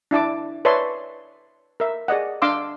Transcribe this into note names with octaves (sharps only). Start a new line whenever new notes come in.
D4 E4 A5 D6
B4 C#5 D5 E5 A5 C6
A#4 E5
G#4 D5 D#5 F#5
D4 F5 C6 D6 E6